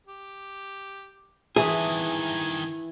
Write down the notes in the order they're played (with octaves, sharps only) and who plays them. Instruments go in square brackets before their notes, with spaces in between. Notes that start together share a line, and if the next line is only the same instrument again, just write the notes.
[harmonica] G4
[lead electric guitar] G2 D#3 [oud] E3 [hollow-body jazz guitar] G#4 [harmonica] G#5